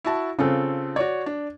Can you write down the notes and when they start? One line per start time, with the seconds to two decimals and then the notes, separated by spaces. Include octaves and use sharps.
0.04 E4 F#4 A5
0.39 C#3 C4 F4 A4
0.96 F#4 C#5 D5
1.26 D4